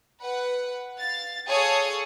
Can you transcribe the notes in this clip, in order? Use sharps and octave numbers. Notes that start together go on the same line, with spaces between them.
B4 F#5
F5 A6
G#4 A4 C#5 F5 D#6